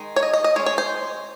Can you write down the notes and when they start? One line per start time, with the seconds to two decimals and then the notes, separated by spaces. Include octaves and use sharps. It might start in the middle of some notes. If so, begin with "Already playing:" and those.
Already playing: D#3 G#3 D#4
0.16 C#5
0.23 D#5
0.33 D#5
0.44 D#5
0.56 G#3 C#5
0.59 C#4
0.66 C#5
0.78 C5